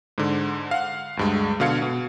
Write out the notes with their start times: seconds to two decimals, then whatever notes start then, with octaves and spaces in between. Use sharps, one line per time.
0.18 G#2 D3
0.71 F5 F#5
1.17 D2 G2 G#3
1.60 B2 D3 F5 G#6 C#7
1.82 B2